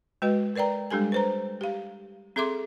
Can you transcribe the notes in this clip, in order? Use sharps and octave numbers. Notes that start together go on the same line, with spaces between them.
G#3 F#4 B4 D#5
A#4 B4 D5 G5 A#5
G3 G#3 D4 G4 A4 G#5
B4 C5 A#5
G4 F5
C4 G#4 A4 E5 C6 D6